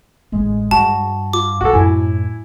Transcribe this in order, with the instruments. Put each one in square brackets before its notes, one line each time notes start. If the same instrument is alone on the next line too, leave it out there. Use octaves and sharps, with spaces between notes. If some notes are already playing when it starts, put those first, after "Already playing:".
[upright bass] A1 D4 [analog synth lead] G#3
[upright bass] G2 [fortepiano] F#4 [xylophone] A5
[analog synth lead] F4 [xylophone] D6
[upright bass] B1 G3 [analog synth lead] F4 [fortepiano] F#4 A4
[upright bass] F#2 [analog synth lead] A2 [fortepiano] E4 G#5